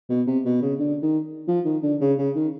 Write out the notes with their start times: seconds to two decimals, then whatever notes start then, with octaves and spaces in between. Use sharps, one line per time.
0.10 B2
0.27 C3
0.45 B2
0.62 C#3
0.79 D3
1.03 D#3
1.48 F3
1.65 D#3
1.83 D3
2.01 C#3
2.18 C#3
2.35 D#3